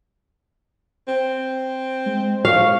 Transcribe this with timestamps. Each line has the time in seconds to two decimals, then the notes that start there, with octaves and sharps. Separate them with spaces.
1.08 C4
2.06 G#3
2.45 F5 C#6